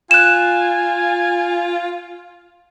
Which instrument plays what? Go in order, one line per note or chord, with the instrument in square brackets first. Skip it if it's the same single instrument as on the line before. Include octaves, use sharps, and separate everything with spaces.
[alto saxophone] F4 [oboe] G#5 [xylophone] F#6 E7